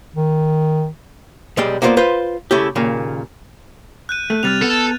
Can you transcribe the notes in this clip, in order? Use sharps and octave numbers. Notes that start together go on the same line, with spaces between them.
D#3
B1 G3 G#3 D5 G5
A#3 B3 F4 B4 C5 D5
F4 B4 C5
C#3 A3 E4 G4
D#2 A#2 C#3
F#6 G6 D#7
A3
C3 G3 F6 A6 F7
B3 A4